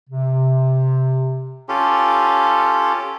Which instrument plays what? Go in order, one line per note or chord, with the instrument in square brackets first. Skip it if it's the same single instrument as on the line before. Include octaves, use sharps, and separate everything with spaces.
[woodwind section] C3
[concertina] C#4 F4 G4 A4